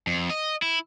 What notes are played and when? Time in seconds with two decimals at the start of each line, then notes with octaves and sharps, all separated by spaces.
0.07 F2
0.30 D#5
0.62 E4